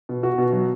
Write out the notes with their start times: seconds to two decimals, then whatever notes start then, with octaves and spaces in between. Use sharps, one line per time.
0.09 B2
0.23 F#4
0.38 B2
0.53 F#3